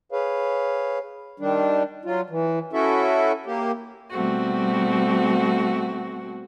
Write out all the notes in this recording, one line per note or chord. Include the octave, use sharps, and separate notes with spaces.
G#4 B4 C#5 F5
D#3 G3 D4
F#3 F4
E3
C#4 E4 F#4 A4 E5
A#3 G4
B2 G3 A3 C4 F#4